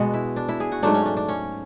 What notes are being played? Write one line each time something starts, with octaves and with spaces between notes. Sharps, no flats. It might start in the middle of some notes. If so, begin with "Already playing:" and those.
Already playing: B2 G#3 B3 F#4
E4
D4
E4
G#4
F#4
G#2 F#3 A3 D4
C#4
D4
D4
C#4